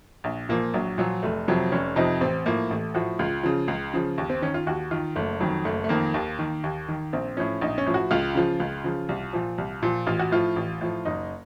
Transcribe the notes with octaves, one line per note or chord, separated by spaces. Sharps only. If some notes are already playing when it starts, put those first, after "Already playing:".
A#1
A#2 F3 A#3
A#1 F#3
A#2 F3 F#3
F1 A3
F2 C3 F3 F#3
F1 C#4
F2 C3 F3 D#4
A1 C4
A2 F3 A#3
A1 A3
A2 F3 F#4
C#2 F4
C#3 F3
C#2
C#3 F3
D#2
C4
D#3 C#4
F4
D#2 F#4
D#3 F4
F#1 A3
F2 D#3 F#3
F#1 A3
A3
F2 D#3 A#3
D#2
D#3
D#2
D#3
A#1 C4
A2 F3 C#4
A#1 D#4
C#4
A2 F3
F#4
C#2 F4
C#3 F3
C#2
C#3 F3
C2
A#2 F3
C2
A#2 F3
A1 F4
F#4
A2 F3 F4
A1
A2 F3
F#1 D#4